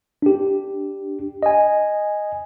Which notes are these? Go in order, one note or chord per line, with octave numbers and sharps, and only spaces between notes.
D4 G4
D#5 G#5